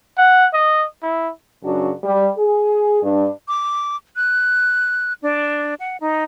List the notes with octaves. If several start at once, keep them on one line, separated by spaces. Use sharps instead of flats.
F#5
D#5
E4
F#2 C#3 D4 F#4
G3
G#4
G2 D4
D6
F#6
D4
F#5
D#4